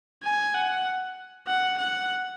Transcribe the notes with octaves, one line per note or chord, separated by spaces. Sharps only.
G#5
F#5
F#5
F#5